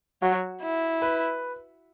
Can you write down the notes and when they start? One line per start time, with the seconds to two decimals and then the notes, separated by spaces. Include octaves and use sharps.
0.22 F#3 F#4
0.62 E4
1.02 B4